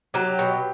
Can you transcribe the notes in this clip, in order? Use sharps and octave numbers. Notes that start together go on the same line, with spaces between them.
F#3 G4
B2